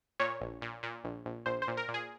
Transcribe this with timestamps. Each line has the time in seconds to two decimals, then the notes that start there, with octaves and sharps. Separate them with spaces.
0.20 A#2 C#5
0.41 A#1
0.62 A#2
0.83 A#2
1.04 A#1
1.26 A#1
1.46 A#1 C5
1.62 C5
1.68 A#2
1.77 A#4
1.88 A#2
1.94 G#4